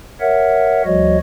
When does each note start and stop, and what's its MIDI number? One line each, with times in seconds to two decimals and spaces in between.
0.20 0.82 70
0.20 0.82 73
0.20 0.82 76
0.20 0.82 78
0.85 1.18 38
0.85 1.18 53
0.85 1.18 55
0.85 1.18 66
0.85 1.18 73
0.85 1.18 75